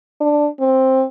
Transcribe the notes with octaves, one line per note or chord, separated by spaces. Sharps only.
D4
C4